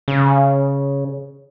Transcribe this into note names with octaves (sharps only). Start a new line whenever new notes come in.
C#3